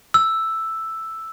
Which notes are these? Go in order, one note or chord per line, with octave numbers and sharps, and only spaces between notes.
E6